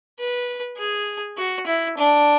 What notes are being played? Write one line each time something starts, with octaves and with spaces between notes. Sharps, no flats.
B4
G#4
F#4
E4
D4